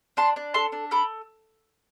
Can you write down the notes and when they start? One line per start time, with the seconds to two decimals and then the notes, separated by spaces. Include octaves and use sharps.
0.17 D4 A5 C6
0.36 D4
0.54 A4 A5 C6
0.72 D4
0.91 A4 B5 D6